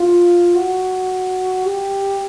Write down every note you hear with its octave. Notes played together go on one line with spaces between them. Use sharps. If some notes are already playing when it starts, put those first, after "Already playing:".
Already playing: F4
F#4
G4